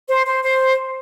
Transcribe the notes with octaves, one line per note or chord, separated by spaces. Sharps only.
C5
C5
C5